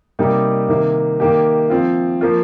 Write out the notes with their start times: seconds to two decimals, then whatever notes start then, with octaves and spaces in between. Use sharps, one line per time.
0.19 C3 G3 A#3 D#4 G4
0.68 C3 D#3 A#3
1.20 D#3 A#3 G4
1.70 F3 C4 F4
2.21 F3 A#3 F4